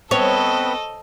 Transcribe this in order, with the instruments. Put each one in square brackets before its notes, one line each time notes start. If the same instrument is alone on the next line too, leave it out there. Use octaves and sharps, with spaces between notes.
[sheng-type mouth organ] B3 C4 B4 [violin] A4 D#5 [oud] C#5